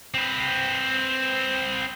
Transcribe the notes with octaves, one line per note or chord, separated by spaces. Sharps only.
C4 B4